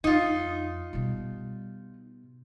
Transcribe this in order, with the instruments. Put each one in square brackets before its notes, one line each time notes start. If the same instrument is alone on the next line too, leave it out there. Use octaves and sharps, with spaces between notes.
[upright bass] F2 [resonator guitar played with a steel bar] D#4 F4
[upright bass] B2 G3